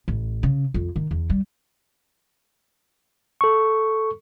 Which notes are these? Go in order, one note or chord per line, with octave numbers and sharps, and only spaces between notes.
A1
C#3
F2
D#3
E2
G3
A4 C#6